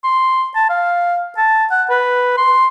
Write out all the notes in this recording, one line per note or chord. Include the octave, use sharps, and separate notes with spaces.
C6
A5
F5
A5
F#5
B4
C6